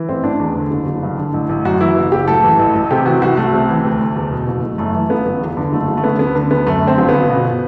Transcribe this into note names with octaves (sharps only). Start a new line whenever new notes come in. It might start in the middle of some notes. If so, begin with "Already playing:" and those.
Already playing: E3
A1 C4
A1 D4
E2
D3
F#1
F#1
G2
D3
A1
A1
F#2 F#4
E3 E4
F#1
F#1 G4
A2 A4
E3
A1
A1
C3 G4
E3 F#4
C2 F#4
C2 A3
C3
E3
D2
D2
E2
B2
F#1
F#1
F#2 A3
E3
G1 B3
G1
E2
D3
F#1 A3
F#1
A3
D3 B3
D2 B3
D3
D2 B3
F#2 A3
D3
C4
G1
G1 B3
B2